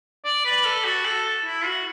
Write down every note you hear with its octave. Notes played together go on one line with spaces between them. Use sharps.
D5
B4
A4
F#4
A4
E4
F#4